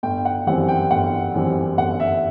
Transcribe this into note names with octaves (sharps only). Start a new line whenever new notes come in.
G1 G5
F#5
F#2 E3 G3 C4 F#5
G5
G1 F#5
F#2 E3 G3 C4
G1 F#5
E5